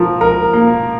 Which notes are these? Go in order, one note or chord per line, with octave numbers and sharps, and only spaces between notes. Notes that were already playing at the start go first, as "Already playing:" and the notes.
Already playing: F3 A#4
A#4
A#3